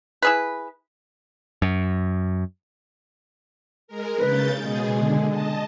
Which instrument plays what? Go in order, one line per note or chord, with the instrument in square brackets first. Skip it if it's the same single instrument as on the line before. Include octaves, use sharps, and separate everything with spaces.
[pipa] E4 G#4 B4
[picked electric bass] F#2
[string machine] G#3 A#4
[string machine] C#3 G6 A6 [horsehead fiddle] B4
[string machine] B2 G#4 [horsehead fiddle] G#3
[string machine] D3
D#5 A5